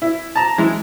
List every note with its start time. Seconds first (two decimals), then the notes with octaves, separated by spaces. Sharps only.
0.02 E4
0.36 A5 A#5
0.58 E3 G#3